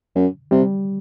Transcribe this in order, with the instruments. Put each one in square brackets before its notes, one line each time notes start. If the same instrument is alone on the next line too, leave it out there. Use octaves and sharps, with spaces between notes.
[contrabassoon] F#2
[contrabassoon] C3 [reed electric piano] G3